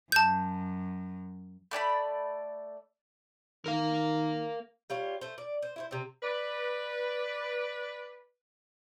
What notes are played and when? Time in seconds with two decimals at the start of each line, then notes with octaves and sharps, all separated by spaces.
0.12 F#2 A5 G6
1.71 A3 D5 G#5 B5
3.66 D#3 A#4 F5
4.90 G3 F4 C#5
5.21 A3 C5
5.38 D5
5.63 C5
5.76 E4 F4 C5
5.91 C3 C4
6.22 B4 D5